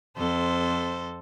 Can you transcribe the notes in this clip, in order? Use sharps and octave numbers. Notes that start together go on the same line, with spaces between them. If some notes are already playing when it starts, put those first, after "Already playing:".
F2 A4 C5